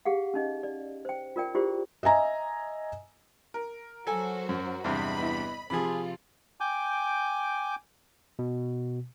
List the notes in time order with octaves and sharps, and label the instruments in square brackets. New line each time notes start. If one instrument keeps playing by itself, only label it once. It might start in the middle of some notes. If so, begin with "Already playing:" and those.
[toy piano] G4 G#4 F5 F#5
C#4 D#4 D#5
D5
C5 G5
F4 A#4 D5 G5
E4 F4 G4 G#4 C5 D5
[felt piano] D#5 E5 G#5 A#5
[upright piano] A#4
[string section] F#3 F#4 C5 [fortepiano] A4 G#5
[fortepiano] F#2
[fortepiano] E2 G2 C3 [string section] D#5 B5
[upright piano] B3 E4
[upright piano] C3 F3 [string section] F4 [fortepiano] G#4 B5
[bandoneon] G5 G#5 D6 G6
[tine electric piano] B2